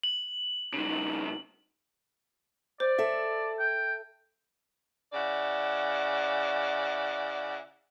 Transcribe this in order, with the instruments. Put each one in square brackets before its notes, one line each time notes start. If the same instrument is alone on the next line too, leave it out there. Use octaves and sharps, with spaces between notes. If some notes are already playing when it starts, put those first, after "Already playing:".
[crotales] F#7
[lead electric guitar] G2 C#3 [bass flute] D#4
[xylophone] C5 [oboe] D5
[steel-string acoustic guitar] A4 E5
[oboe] G5
[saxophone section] C#3 E4 D5 F#5